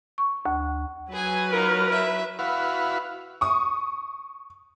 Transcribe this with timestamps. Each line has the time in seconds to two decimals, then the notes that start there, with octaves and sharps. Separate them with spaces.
0.18 C#6
0.46 D2
1.12 F#3 G#4 B4 G#5
1.52 D#4 F4 A#4
1.89 E4 E5
2.39 E4 F#4 B4 F5
3.41 C#6 D#6